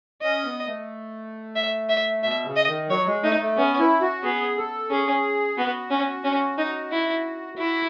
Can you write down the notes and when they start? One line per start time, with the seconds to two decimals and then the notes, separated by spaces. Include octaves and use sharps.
0.22 C#4 D#5
0.45 B3
0.67 A3
1.56 E5
1.89 E5
2.23 B2 E5
2.45 C#3
2.57 D#5
2.67 D#3
2.89 F#3 C#5
3.07 G#3
3.24 A3 D#4
3.40 A3
3.57 B3 C#4
3.79 E4
4.01 F#4
4.23 B3 G#4
4.57 A4
4.90 C#4 G#4
5.57 B3 F#4
5.91 C#4
6.24 C#4
6.58 D#4
6.92 E4
7.58 E4 F#4